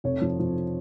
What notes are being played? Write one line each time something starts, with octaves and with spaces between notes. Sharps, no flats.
F1 C#5
F3
F3